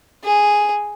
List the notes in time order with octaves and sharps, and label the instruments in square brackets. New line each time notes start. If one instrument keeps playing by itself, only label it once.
[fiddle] G#4